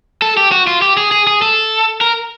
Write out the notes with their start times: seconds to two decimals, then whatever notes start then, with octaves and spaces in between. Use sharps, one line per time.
0.22 A4
0.37 G4
0.52 F#4
0.67 F4
0.82 G4
0.97 G#4
1.12 G#4
1.27 G#4
1.42 A4
2.01 A#4